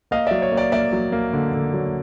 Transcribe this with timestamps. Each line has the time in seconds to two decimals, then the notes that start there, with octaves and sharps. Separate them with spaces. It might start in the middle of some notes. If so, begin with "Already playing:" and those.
0.11 A#3 D#5 F5
0.27 F#3 D5 E5
0.42 C#5
0.52 A#3
0.57 D5
0.72 A#3 D5 E5
0.93 F#3
1.12 A#3
1.33 D3
1.54 D3
1.74 F#3